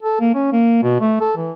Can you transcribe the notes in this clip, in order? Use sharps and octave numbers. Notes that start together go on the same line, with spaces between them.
A4
A#3
C#4
A#3
B2
A3
A4
E3